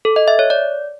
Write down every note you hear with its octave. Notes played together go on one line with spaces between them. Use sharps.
A4
D#5
E5
C#5
D5